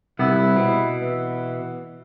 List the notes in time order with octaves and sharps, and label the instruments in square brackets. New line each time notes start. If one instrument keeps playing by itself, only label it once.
[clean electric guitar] C2 B3 [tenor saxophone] E4
[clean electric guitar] B2
[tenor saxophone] E3